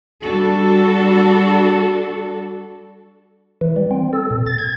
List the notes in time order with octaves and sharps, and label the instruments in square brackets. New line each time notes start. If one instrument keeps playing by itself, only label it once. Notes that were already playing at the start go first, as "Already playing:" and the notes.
[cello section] G3 D4 F#4 A4
[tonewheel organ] E3
G3
C4
A4
A#2
A6
G#6